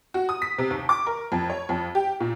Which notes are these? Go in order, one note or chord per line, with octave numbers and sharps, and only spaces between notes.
F#4
D#6
B6
C3
D#2
D6
A#4
F2
C#5
F2
G4
A#2